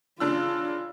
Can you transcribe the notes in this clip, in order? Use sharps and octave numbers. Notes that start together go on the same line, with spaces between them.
C#3 D4 F4 E6